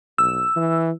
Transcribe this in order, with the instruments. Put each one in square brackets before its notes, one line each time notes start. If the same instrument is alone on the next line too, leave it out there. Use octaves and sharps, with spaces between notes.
[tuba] B1 [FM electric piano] E6
[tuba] E3